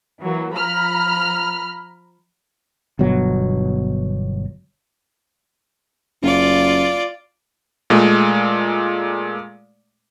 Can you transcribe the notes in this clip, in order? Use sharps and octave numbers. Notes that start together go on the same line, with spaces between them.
E3 F#3 A#3
F3 A#5 B5 F6
G1 B2 F#3
F#1 F4 D5
A#2 G#3 A3